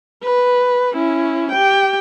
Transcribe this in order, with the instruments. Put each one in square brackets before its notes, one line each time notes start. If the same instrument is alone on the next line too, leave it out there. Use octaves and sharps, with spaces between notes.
[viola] B4
C#4 E4
G4 G5